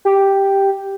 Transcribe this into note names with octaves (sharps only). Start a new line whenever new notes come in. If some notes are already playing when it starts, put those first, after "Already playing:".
G4